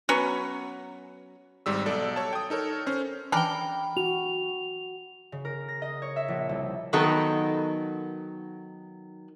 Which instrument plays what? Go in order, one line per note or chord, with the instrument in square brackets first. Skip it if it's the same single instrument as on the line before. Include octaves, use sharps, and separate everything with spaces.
[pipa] F#3 B3 C#4 C#6
[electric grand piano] G#1 G#2 G3 E6
B1 A4 D5
C#5 A5
G5 D#6
D#4 A4 A#4 C#5
C#4 C5 F6
[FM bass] E3 [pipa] D4 G4 A#4 [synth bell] G5 B5
[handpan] F#4 [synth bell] F7
[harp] C#3
A#4
A#6
D#5
C#5
E5
A#1
C2
[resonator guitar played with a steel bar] D#3 F#3 B3 D#4 A4 A#4